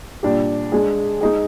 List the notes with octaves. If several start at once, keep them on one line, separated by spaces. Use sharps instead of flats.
A#2 G3 D4 G4
G#3 D4 G#4
G#3 D#4 G#4